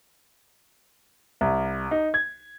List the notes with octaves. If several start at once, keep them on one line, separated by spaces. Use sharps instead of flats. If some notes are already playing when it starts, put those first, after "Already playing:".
C2
D#4
G#6